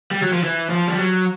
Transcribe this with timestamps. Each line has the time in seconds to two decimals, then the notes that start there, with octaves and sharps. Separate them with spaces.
0.11 G3
0.22 F#3
0.33 F3
0.43 E3
0.70 F3
0.87 G3
0.97 F#3